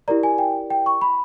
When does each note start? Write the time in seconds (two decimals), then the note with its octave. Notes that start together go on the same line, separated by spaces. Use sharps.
0.08 E4 G4 A#4 D5 A#5
0.23 G#5
0.38 G5
0.70 G5
0.86 C#6
1.01 B5